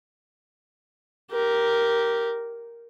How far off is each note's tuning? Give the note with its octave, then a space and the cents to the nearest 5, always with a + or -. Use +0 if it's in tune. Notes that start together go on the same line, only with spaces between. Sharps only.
G4 -10 A#4 +0